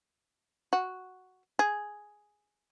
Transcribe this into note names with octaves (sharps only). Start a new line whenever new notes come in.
F#4
G#4